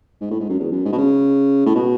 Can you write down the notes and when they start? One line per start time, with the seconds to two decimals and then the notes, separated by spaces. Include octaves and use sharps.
0.21 G#2
0.30 A2
0.40 G#2
0.49 F#2
0.59 E2
0.71 F#2
0.85 G#2
0.92 B2
0.98 C#3
1.66 A2
1.75 B2